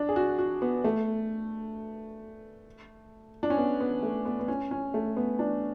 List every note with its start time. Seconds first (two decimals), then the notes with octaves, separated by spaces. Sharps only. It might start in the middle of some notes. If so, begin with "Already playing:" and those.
Already playing: D4
0.09 G#4
0.16 F#4
0.39 F#4
0.62 B3
0.84 A3
3.43 D4
3.50 C#4
3.58 B3
3.81 B3
4.03 A3
4.25 B3
4.40 B3
4.48 C#4
4.71 C#4
4.94 A3
5.17 B3
5.39 D4